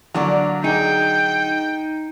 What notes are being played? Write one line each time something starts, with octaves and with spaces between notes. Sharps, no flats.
D3 F#3 A3 A#3 D4
D#4 G#4 G5